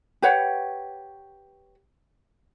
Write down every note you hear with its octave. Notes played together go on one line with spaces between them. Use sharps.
G4 B4 C#5 F#5